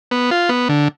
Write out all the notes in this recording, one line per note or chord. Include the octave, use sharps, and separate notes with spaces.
B3
F4
B3
D3